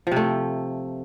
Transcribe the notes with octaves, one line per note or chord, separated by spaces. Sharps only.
C3 F3 A3